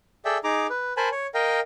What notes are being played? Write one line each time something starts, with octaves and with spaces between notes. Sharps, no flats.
G#4 A4 D5 E5 G5
D#4 G#4 A#5 D6
B4
A#4 C5 G#5 A5 B5
C#5
A#4 D#5 F5 G5